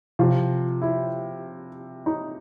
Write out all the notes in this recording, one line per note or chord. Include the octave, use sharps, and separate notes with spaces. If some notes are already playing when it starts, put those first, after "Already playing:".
C3 F3 F4
E4
D#4